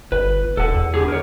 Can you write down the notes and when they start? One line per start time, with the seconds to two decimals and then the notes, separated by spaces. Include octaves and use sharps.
0.12 G1 B4
0.57 E1 A4 F#5
0.74 E2
0.94 D3 G4 G#4
1.08 A#4 C#5